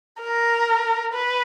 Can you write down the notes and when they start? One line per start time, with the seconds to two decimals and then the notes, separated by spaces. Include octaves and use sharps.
0.21 A#4
1.14 B4